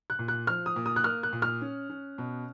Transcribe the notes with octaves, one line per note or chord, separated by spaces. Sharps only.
F#6
A#2
F#6
F3 F6
D#6
A#2
D#6
F#6
A#3 F6
F#6
A#2
F6
C#4
C#4
B2